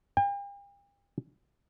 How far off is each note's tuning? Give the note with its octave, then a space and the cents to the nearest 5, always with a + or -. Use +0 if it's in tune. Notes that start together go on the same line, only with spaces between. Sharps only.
G5 +40